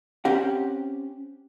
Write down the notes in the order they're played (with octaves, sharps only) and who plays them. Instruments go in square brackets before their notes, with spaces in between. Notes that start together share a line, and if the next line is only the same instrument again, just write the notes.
[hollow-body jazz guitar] C4 C#4 G4 F#5